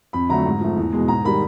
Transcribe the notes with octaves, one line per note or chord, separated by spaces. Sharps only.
F2 B5
D3 F#3 A3 A#5
G#2
F3 A3
E2
B2 G#3
G#2 A#5
D#3 G3 B5